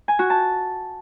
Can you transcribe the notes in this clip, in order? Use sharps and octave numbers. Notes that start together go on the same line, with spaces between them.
G#5
F#4
A5